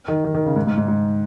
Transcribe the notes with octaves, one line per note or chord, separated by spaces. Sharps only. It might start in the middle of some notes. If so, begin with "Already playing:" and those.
D#3
D#3
D#3
C#3
G#2
G#2
G#2
G#2